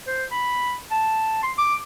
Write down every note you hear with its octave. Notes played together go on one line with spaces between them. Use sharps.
C5
B5
A5
C6
D6